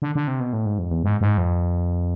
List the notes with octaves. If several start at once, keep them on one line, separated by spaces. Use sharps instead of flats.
D3
D3
C3
B2
A2
G#2
F2
E2
G#2
G#2
F2